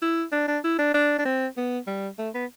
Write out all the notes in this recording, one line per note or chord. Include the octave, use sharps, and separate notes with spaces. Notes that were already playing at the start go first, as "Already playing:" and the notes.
E4
D4
D4
E4
D4
D4
D4
C4
B3
G3
A3
B3